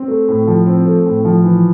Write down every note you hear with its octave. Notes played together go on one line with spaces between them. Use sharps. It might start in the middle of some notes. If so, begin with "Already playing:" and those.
Already playing: C4
A3
A2
F3
C4
A3
A2
F3
E3